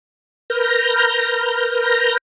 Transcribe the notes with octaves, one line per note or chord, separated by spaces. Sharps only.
A#4 B4 F6 G6 A#6